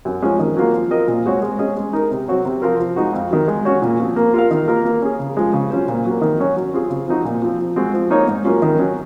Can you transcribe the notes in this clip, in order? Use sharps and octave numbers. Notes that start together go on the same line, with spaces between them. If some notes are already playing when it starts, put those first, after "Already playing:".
F#2
F3 G#3 C#4
D#3
F#3 A#3 F4
F3
C4 F4 A#4 D#5
A#2
G#3 C4 F#4 C#5
G#3
C#4 G#4 D#5
G#3
D#4 A#4
C3
F#3 C4 F#4 C#5
C3
F3 C4 F4 A#4
F3
G#3 D#4 F#4
F2
D#3 F#3
G#3
C#4 F#4 C#5
A#2
F3 C4
A#3
F4 A#4 F5
D#3
A#3 F4 A#4
A#3
C#4 G#4
C#3
F3 G#3
C#3
F#3 C#4 F4 C5
A#2
F#3 A#3
D#3
F#3 C#4 F#4 C#5
F#3
C4 F4 G#4
C#3
F3 C4 D#4 F#4
A#2
F3 C4
F3
G#3 C4 F#4
F3
A#3 D#4 A#4 C#5
G#2
F#3 A#3 C#4 F4
D#3
F#3 C#4